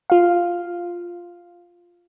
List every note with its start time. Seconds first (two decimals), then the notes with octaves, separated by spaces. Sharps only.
0.10 F4 F5